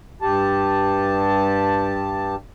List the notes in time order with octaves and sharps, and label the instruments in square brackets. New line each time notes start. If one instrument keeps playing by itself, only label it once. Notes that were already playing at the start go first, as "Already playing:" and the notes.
[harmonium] G2 G4 A5